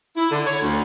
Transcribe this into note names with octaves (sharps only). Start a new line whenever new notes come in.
E4
D3
C#5
D2